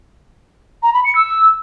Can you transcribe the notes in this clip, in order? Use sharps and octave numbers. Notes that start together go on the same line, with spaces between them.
A#5
B5
C#7
E6